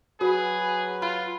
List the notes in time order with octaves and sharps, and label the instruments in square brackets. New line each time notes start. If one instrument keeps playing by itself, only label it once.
[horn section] F#3 B4 [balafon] F#4 [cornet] G#4
[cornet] F4 [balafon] B5